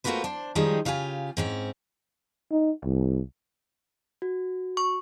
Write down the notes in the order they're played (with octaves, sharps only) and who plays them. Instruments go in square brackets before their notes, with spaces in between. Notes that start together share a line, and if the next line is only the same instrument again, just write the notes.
[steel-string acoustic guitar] A3 A#3 F4 F#4 B4 C5
D4 C5
D#3 F3 G3 G#3 D#4 G#4
C#3 F4 G4 A#4 G#5
G#2 C4 C#4
[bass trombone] D#4
C2
[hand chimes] F#4
[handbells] C#6